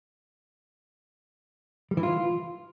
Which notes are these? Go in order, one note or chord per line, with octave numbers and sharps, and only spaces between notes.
G3
E3
F4